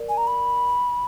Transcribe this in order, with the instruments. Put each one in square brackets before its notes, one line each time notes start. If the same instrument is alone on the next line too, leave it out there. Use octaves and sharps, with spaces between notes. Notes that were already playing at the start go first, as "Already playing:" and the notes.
Already playing: [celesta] A#4 D5
[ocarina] G#5
A#5
B5